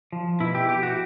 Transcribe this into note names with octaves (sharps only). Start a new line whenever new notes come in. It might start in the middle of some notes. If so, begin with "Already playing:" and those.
F3
B2 E4
G4
G4
F#4